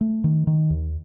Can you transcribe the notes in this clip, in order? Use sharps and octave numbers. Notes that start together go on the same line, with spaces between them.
A3
D#3
D#3
D#2